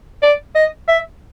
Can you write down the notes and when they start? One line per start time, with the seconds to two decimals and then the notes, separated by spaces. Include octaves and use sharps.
0.23 D5
0.55 D#5
0.88 E5